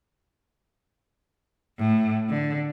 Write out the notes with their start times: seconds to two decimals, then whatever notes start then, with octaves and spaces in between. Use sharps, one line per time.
1.78 A2
2.29 D3